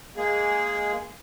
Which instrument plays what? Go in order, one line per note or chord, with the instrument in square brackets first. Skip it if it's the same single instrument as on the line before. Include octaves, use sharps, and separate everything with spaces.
[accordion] G#3 A#3 G#4